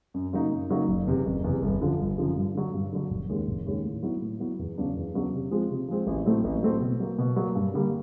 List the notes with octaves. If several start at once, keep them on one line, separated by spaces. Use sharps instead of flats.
F#2
C#3 F#3 A#3 D#4
F#2
C#3 F#3 A#3 D#4
F#1
E2 C3
F#1
E2 C3
G1
F#2 D3 F3
G1
F#2 D3 F3
G2
D3 F#3
G2
D3 F#3
F1
D#2 D#3 G#3 C#4
F1
D#2 D#3 G#3 C#4
A2
F#3 B3 E4
A2
F#3 B3 E4
E2
C#3 F#3 B3 D4
E2
C#3 F#3 B3 D4
C3
F3 G#3 C4
C3
F3 G#3 C4
A1
A2 F#3 A3 C4
A1
A2 F#3 A3 C4
B2
F#3 A#3
B2
F#3 A#3
G2
D3 G3 A#3